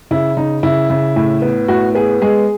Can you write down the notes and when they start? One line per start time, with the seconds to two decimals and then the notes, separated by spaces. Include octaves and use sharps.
0.11 C#3 E4
0.37 C#3 D#4
0.63 C#3 E4
0.90 C#3
1.16 A2
1.42 B3
1.68 A2 F#4
1.95 B3 G#4
2.22 G#3 G#4